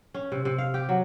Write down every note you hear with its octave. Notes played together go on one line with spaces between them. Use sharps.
C#4
C3
C3
F5
G4
F#3